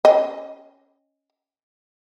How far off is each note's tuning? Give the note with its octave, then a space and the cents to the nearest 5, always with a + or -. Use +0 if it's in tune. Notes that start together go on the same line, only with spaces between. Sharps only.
C#4 +0 D#5 +0 G5 -15